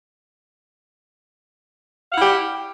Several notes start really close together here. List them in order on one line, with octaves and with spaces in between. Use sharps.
F5 F#5 E4 G4